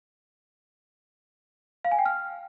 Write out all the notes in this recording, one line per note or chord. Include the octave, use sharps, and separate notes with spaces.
F5
G#5
G5
F6